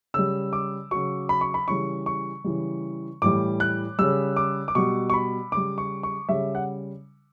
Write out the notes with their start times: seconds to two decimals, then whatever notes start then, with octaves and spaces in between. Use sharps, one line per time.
0.14 C#3 G3 E6
0.53 D6
0.91 C#3 F#3 C#6
1.29 B5
1.41 C#6
1.54 B5
1.68 C#3 E3 G3 C#6
2.06 C#6
2.44 C#3 E3 G3
3.22 A2 E3 G3 D6
3.60 F#6
3.99 C#3 G3 E6
4.36 D6
4.68 D6
4.75 B2 G3 C#6
5.10 C#6
5.14 B5
5.52 C#3 G3 D6
5.78 C#6
6.03 C#6
6.29 C#3 G3 E5
6.55 F#5